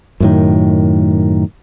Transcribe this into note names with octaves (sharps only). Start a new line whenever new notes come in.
F#2 A2 D#3